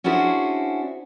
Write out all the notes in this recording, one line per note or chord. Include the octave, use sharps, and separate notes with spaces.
C#4 D4 E4 F#4 G#4 C5